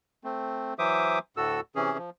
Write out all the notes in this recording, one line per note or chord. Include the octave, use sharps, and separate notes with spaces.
A3 C4
E3 F#3 C5 E5 D6 D#6
D2 A2 F#4 A4 E6
C3 E3 C#4 G#4
F3